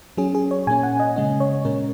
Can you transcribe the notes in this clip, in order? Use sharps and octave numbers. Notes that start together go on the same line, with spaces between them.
F#3 C#4 G#4
G#4
C#5
A#2 A#3 C#4 G#5
F#5
D#5
C#3 G#3 C#4 D#5
C#5
A#2 G#3 C#4 A#4